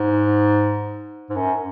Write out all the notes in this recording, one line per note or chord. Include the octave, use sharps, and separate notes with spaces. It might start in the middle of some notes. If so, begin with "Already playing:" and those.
Already playing: G#2
G#2
F#2